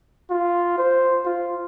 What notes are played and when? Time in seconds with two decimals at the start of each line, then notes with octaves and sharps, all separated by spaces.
0.30 F4
0.78 C5
1.25 F4